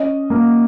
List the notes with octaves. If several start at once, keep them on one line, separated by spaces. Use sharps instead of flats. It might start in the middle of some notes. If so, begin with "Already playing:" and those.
Already playing: C#4 D#5
A#3